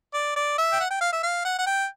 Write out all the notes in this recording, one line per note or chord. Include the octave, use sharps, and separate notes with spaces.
D5
D5
E5
G5
F#5
G5
F5
E5
F5
F#5
F#5
G5